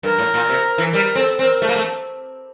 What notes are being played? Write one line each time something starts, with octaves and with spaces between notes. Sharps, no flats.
G2 A#4
A2
A#2
C3
E3
G3 A#4
C4 A4
C4 C5
A#4
A3
A#3
A3